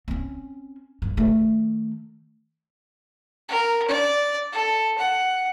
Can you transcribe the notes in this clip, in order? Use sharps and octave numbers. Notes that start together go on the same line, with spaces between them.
C4 C#4
G2
D#3 A3
A#4
D5
A4
F#5